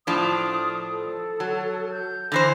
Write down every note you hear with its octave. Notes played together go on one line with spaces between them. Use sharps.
A2 F3 D4 D#6
A4
F#3
G6
D3 E3 C5 A#6